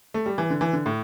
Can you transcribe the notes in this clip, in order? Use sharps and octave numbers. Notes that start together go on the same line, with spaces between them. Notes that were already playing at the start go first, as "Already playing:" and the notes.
A3
G3
E3
D3
E3
D3
A2